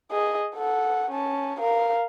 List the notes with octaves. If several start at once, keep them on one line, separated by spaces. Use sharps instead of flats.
G#4 D#5
A4 F#5
C#4 A5
A#4 F5